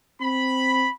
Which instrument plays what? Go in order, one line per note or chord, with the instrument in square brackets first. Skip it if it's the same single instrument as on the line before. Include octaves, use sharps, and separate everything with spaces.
[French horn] C4 [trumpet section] B5